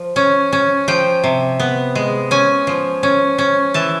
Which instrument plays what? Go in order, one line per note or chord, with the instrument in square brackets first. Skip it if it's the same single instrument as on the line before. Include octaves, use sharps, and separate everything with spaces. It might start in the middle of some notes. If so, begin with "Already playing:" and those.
Already playing: [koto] F3
C#4
C#4
F3 G5
C3
B3
G#3
C#4 G#5
F3
C#4
C#4
E3 A5